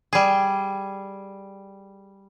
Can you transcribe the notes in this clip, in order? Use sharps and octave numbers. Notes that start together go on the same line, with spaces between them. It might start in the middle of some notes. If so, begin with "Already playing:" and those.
G3 G#4